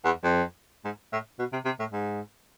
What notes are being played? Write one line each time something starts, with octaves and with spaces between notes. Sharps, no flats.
E2
F2
G#2
A2
B2
C3
C3
A2
G#2